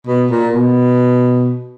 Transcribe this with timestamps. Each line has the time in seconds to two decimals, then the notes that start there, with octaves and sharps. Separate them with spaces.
0.07 B2
0.30 A#2
0.53 B2